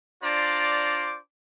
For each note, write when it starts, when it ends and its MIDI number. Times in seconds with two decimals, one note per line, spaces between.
0.23 1.19 62
0.23 1.19 65
0.23 1.19 72
0.23 1.19 74
0.23 1.19 82
0.23 1.19 86